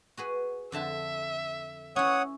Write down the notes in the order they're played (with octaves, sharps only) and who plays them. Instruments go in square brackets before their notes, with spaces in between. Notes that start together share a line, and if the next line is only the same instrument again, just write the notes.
[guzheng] F#4 G#4 B4
[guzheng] F2 D3 A5 [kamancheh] E5
[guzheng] C#4 E4 [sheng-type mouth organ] C#5 F#5 D#6